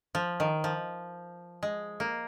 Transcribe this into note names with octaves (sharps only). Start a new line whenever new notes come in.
F3
D#3
F3
G#3
A#3